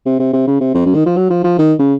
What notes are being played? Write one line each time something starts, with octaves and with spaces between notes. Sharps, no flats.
C3
C3
C3
C#3
C3
F2
F#2
D#3
F3
F#3
F3
F3
D#3
C#3